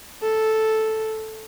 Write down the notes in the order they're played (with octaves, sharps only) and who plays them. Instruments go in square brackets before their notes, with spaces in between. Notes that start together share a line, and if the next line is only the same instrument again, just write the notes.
[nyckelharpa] A4